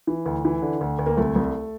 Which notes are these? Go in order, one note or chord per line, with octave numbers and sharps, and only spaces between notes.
E3
D2
E3
D3
D2
D2
A#3
C2 A3
C2